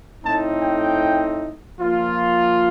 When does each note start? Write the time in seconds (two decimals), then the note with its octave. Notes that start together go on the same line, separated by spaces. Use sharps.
0.23 A2 A3 C4 D#4 A5
0.62 G5
1.80 F3 A#3 F4